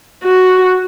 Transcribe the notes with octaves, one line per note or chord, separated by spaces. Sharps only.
F#4